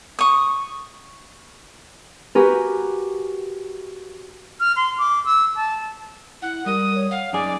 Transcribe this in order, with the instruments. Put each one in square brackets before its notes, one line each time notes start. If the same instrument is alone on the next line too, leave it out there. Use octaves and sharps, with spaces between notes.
[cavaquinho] C#6 D#6
[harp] F#4 G4 A#4 B4 G#5
[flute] F6
C6
D6
E6
A5
[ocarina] E4 [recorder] F#5
[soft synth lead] G3 [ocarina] A#4 [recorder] D#6
[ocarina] C#5
[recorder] F5 [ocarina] F#5
[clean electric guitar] F#2 G#4 [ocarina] D#4 [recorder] D5 [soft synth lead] D6